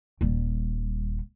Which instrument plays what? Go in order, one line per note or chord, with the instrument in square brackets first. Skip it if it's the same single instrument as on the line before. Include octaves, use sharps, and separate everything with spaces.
[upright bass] D#1 G3